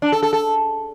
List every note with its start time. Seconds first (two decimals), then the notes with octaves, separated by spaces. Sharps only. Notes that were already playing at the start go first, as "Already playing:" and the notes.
0.02 D4
0.12 A4
0.23 A4
0.33 A4